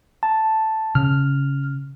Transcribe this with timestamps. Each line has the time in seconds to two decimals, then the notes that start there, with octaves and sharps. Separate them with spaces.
0.23 A5
0.95 C#3 F6